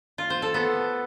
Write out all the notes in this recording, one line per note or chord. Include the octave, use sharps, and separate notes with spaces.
F4
C5
A4
B3